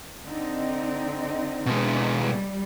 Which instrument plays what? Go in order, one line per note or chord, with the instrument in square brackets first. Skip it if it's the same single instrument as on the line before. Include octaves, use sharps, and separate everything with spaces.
[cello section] D3 C4 D#4
[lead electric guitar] B2 G#3
[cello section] G3